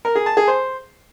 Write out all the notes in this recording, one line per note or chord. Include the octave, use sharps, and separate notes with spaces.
A#4
G#4
A5
G#4
C5